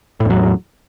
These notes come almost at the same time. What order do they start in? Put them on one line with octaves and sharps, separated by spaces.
A2 E2 F#3